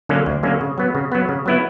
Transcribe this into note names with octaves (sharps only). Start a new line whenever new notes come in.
D3 F#3 A#3 C#4
D2
D3 F#3 A#3 C#4
C#3
F#3 B3
C#3
F#3 B3
C#3
F#3 B3 E4